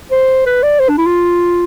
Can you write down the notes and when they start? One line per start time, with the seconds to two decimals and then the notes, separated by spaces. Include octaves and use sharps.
0.11 C5
0.46 B4
0.63 D5
0.80 C5
0.89 D4
0.98 E4
1.06 F4